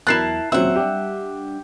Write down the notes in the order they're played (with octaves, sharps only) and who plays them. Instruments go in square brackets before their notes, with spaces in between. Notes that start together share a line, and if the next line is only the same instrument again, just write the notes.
[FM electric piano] E2 F#3 [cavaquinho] E4 A#4 A5 [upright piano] F#6 C7 E7
[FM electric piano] D#2 A#2 C#3 [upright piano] F#3 C4 [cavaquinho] E5 F#5
[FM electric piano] G3 D4 [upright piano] G4